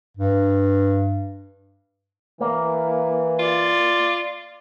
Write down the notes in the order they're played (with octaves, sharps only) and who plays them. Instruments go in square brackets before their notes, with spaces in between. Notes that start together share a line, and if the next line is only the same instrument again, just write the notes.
[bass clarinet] G2
[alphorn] E3 [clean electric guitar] A#3
[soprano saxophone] F4 [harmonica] D5